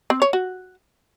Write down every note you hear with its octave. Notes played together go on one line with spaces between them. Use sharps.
C4
C#5
F#4